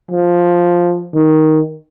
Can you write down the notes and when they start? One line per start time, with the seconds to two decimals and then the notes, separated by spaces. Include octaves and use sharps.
0.11 F3
1.14 D#3